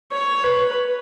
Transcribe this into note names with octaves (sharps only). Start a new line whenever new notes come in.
C#5
B4